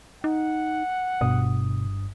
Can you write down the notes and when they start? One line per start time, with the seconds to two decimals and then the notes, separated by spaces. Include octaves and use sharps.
0.24 D#4 F#5
1.21 G1 G2 B2 D#6